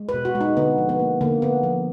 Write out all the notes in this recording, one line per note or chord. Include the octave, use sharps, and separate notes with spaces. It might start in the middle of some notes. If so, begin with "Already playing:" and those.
Already playing: G#3
B4
B2
F#4
G#3
D#4
D3 B3
F3
B3
A#3
D3 A#3
D3 B3
F3